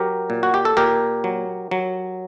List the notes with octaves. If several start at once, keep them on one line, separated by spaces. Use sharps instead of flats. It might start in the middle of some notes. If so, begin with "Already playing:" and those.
Already playing: F#3 G4 A#4
A#2
F#4
G4
A4
A#2 G4 A#4
F#3
F#3